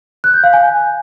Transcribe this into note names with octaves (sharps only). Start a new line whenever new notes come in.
F#6
G6
F5
G#5